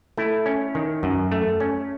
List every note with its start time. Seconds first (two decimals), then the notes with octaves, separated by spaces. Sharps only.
0.18 A3 E4
0.46 C#4
0.75 D#3
1.03 F#2
1.32 A3
1.60 C#4